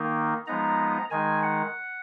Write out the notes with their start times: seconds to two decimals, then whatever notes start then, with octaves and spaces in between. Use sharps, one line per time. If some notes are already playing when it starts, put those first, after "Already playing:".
Already playing: D#3 A#3 D#4
0.46 F3 G#3 B3 D#4 A#5
1.11 D#3 G#3 D#4 G#5
1.43 F#5